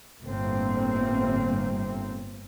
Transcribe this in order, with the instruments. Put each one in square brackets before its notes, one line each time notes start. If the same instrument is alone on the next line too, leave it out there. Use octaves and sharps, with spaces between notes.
[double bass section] G1 A2 A3 A#3 C4